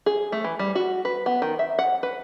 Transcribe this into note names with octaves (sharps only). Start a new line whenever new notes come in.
G#4
A3
E3
G3
F#4
B4
B3
D#3
E5
F#5
B4